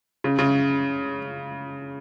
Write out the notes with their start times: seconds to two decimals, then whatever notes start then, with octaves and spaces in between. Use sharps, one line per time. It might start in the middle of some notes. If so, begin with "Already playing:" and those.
0.24 C#3
0.39 C#3